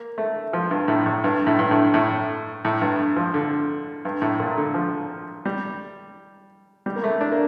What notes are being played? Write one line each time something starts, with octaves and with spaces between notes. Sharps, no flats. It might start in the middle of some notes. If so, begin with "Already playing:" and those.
Already playing: A#3
A3
F3
G2
A2
A2
G2
A2
G2
A2
A2
A2
G2
F3
D3
G2
A2
A#2
D3
F3
G3
G3
A#3
A3
D4
A#3